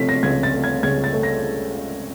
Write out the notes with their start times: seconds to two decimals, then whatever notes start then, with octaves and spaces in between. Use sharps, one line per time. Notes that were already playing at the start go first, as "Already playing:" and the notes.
Already playing: C3 F3 A3 B6 C7
0.09 A#6
0.23 C#2 G#6
0.43 A6
0.54 A3
0.64 G#6
0.83 C#2 G#6
1.04 A6
1.13 A3
1.23 A#6